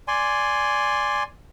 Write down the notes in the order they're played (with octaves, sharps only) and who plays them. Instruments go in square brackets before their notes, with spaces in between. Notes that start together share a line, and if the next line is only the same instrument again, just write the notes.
[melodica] D5 G#5 C6